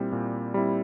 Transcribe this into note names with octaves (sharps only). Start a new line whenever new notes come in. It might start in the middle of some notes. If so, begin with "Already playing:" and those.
Already playing: A#2 G3 C4 E4
A#2
G3 C4 E4